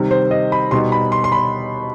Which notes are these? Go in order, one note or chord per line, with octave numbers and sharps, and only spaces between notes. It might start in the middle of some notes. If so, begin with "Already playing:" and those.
Already playing: C3 D#3 G3
C5
D#5
B5
B2 G3 B3 D#4 C6
B5
C6
C6
B5